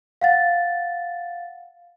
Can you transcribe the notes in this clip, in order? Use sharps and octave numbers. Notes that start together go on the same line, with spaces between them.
F5 F#5 A6